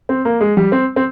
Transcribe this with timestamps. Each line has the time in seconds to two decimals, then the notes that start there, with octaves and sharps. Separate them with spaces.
0.09 C4
0.25 A#3
0.41 G#3
0.57 G3
0.72 C4
0.96 C4